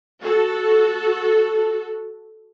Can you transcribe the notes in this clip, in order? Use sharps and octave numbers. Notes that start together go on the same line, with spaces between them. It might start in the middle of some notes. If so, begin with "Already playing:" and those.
F#4 A4